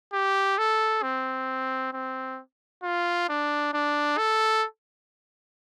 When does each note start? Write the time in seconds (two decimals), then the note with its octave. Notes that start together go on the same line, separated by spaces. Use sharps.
0.13 G4
0.58 A4
1.03 C4
1.93 C4
2.83 F4
3.29 D4
3.74 D4
4.18 A4